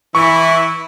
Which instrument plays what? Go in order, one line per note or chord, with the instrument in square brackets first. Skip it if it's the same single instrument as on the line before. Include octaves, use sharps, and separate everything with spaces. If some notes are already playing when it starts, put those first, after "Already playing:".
[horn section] E3 E4 [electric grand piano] C#6